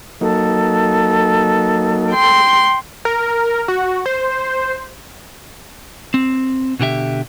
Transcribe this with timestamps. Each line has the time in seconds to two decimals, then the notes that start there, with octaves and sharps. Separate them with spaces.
0.21 F#3 A#3 D#4 A4
2.11 G5 C6
3.05 A#4
3.68 F#4
4.06 C5
6.14 C4
6.79 B2 D3 G4 E5